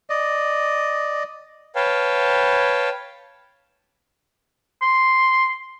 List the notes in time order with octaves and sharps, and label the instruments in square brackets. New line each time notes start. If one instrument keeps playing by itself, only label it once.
[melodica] D5 D#5
[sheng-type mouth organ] B4 C#5 F5 G5 A5
[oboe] C6